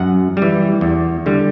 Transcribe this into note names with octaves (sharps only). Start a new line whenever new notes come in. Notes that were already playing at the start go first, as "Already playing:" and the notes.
Already playing: F#2 F#5
G3
E3
E2
D3 G3